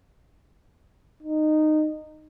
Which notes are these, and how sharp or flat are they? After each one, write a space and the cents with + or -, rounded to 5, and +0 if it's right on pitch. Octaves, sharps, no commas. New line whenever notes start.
D#4 -15